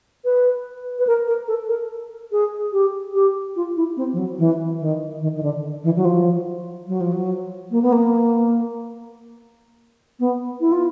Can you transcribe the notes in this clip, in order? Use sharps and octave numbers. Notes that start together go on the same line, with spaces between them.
B4
B4
A#4
A#4
A4
A#4
G#4
G4
G4
F4
E4
C4
F3
F#3
E3
D#3
D#3
D#3
D3
E3
F#3
F3
F#3
F3
F#3
A#3
B3
A#3
B3
E4
F4